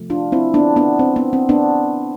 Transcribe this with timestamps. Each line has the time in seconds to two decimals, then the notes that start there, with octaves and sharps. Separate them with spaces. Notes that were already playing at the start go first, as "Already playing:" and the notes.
Already playing: C3 F3 A3
0.10 D4 F4
0.32 C4 E4
0.54 B3 D4
0.76 B3 D4
0.99 C4
1.16 B3
1.33 C4
1.49 B3 D4